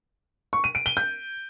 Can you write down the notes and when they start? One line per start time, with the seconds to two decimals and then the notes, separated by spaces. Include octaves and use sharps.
0.53 C#6
0.64 D#7
0.75 D7
0.86 G7
0.97 G6